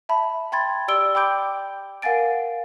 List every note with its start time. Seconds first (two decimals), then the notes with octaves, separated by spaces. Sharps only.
0.09 E5 A5 B5
0.52 G5 B5 C6 G#6 A6
0.88 G4 D5 E6 D7 G7
1.15 G5 B5 D6 G6 D7
2.02 A#4 F5 F#5 G#5 A6 D7